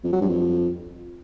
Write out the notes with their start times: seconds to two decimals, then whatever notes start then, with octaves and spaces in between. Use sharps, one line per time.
0.04 F2
0.12 F#3
0.21 G2
0.29 F2